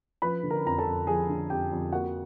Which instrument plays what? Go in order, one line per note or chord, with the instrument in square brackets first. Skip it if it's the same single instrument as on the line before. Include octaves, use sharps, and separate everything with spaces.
[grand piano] F3 B4 B5
D3
A#4 A#5
F2 A#5
A4 A5
F2
F3 G#4 G#5
D3
F2 G4 G5
F2
A#3 F#4 F#5